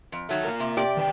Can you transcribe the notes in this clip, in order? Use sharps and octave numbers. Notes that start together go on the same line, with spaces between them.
F2
D#3 F#3 A3
A#3 F4 A#4
C3
C3 G4 D5
D#3 B4 G5